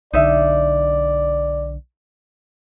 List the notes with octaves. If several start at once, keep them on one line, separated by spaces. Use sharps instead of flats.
B1 D3 D#4 D5 E5